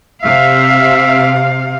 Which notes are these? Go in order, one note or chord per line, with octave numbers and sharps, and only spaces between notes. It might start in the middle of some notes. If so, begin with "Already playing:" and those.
C3 E5 F5